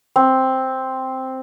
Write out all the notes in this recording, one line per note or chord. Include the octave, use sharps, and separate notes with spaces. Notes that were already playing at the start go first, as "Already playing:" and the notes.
C4